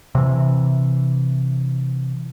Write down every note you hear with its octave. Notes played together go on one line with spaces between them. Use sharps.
C3 E3